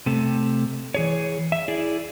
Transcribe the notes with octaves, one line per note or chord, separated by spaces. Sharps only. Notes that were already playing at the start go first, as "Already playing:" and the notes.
C3 A3
E3 G#4 C#5
E5
E4 G#4 D5